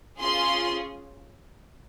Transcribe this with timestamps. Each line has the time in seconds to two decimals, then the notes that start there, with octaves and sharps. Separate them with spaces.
0.19 C#4 F4 G#4 C6